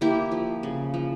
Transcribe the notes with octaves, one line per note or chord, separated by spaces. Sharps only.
A#3 E4 G4
F3
C#3
F3